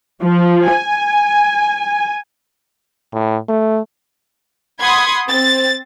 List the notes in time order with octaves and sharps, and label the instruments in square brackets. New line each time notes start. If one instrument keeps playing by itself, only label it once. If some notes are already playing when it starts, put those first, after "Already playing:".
[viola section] F3
G#5
[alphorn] A2
A3
[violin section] F#5 B5 C6 D#6 G#6
C4 A6